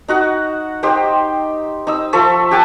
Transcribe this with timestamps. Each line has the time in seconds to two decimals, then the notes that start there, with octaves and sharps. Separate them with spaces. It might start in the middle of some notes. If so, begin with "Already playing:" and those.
0.08 D#4 F#4 F#5
0.83 D#4 G4 C5 G5
1.87 D#4 E6
2.13 F3 A4 E5 C#6
2.51 G4 F#5 G#5 A5